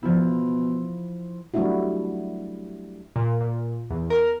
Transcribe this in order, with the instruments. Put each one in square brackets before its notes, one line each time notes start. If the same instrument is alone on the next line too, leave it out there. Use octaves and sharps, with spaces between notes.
[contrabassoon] B2 [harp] F3 E4
[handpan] F#3 G3 A3 D4 E4 F#4
[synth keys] A#2
A#2
E2
A#4